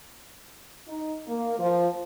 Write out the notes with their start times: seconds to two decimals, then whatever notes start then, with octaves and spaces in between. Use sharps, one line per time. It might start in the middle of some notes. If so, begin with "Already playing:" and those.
0.89 D#4
1.27 A#3
1.59 F3